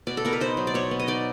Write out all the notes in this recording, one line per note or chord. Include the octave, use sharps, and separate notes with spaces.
B2 D5
A4
B3 A#4
B4
D#4 C5
F#3
D5
B2 C#5
B3
D#5
D#4 D5